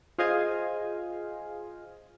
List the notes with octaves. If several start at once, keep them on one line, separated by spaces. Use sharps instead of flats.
F4 G#4 C5 D#5 F5 G#5